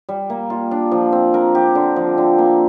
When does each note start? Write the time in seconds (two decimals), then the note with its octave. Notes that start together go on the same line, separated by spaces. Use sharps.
0.09 G3
0.30 A#3
0.50 F4
0.71 D4
0.91 F3
1.12 C4
1.34 A#4
1.55 G4
1.75 D3
1.96 F3
2.18 D3
2.38 A#3